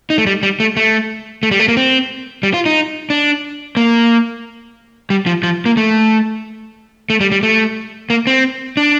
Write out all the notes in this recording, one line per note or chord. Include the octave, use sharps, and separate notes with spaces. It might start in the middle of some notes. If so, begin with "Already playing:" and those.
D#4
A3
G3
G3
A3
A3
A3
G3
A3
A#3
C4
G3
F4
D#4
D4
A#3
G3
F3
F3
A#3
A3
A3
G3
G3
A3
A#3
C4
D4